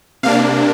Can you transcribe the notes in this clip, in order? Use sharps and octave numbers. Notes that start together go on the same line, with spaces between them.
C3 A#3 D4 F5